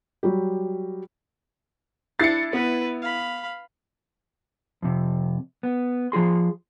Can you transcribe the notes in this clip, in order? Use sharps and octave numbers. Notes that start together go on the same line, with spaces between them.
F#3 G3 G4
D4 E4 A6 C7 C#7
B3 B4
F5 B5
F2 C3
B3
F3 F4 G#4 C6